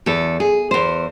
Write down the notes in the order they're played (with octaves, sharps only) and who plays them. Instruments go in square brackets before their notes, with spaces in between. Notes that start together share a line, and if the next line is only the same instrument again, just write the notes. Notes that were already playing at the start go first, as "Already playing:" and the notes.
[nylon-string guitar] E2 A4
G#4
E2 C5